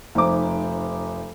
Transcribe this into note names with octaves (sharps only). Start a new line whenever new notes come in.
F1 D#4 C5 D6